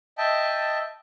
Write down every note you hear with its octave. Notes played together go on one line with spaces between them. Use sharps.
D#5 E5 G5 A5